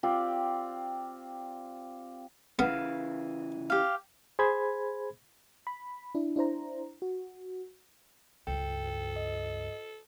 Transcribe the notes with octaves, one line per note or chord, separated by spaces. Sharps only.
C4 F4 G4 D5
C#3 E3 B3 F5
G4 F5
G#4 C5 B5 G#6
B5
D4 E4
D4 E4 C5 A#5
F#4
C#2 G2 A4 G5
D#5